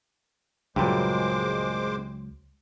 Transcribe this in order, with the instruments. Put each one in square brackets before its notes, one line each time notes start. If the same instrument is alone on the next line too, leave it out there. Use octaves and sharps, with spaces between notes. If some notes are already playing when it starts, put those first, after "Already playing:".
[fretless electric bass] C#2 F#3 [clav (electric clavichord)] G2 A#2 [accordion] G#3 C5 D6